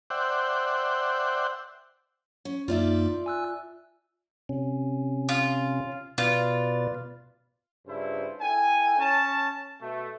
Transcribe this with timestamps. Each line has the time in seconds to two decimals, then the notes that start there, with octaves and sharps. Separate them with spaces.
0.10 C5 D5 E5 F#5 G5
2.45 C#4
2.68 F#2 A#3 D#4 F4 D5 E5
3.26 G#5 E6 F#6
4.49 C3 C#4
5.29 F4
6.18 B2 F4 B4 D5
7.87 G2 C#3 E4 F4 C5
8.40 E4 A4 G5 G#5
8.99 C#4 A5
9.81 B2 A3